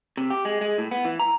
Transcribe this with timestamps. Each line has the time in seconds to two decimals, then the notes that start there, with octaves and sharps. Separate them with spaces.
0.17 C3
0.30 G4
0.45 G#3
0.61 G#3
0.78 A2
0.91 B3
1.05 E3
1.19 A#5